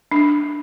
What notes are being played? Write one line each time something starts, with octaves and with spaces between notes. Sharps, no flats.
D4